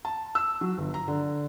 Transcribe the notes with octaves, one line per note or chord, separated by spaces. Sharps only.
A5
E6
F#3
G1
A#5
D3